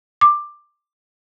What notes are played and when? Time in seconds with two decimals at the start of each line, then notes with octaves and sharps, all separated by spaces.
0.21 D6